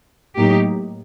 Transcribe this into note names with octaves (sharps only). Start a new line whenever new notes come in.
A2 F#3 A#3 D#4 G4